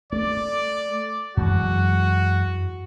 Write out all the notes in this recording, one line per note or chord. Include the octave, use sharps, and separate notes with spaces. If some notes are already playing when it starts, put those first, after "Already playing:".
A3 D5
F#2 E3 G#3 F#4